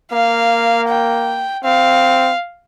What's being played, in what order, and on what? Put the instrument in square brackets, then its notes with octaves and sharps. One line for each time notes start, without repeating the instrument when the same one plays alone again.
[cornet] A#3 [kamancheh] F5
[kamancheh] G5
[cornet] C4 [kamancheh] F5